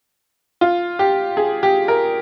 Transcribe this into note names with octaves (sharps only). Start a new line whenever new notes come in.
F4
G4
G#4
G4
A#4